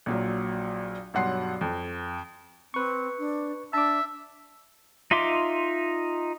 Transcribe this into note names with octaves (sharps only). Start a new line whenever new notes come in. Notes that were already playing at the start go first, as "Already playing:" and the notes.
A#1 A#2 F#3
B1 G2 F#3 F#5 C6 C7
F2
C4 B4 C#6
D4
D4 E5 A5 D6
D#4 F4 E5 C6 D6